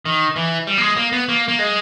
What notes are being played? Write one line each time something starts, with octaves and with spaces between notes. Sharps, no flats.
D#3
E3
G3
A#3
G#3
A#3
B3
A#3
A#3
G#3